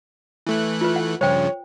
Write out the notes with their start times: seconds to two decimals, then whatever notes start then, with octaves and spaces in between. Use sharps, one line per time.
0.47 E3 A3 F#6
0.81 F4 B4
0.96 F#5
1.21 G2 C#3 F3 C5 C#5 G5